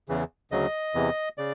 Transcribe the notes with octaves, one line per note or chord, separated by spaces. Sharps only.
E2 C#3 E3
D2 C#3 F#3 D#5
E2 C3 E3
C#3 D5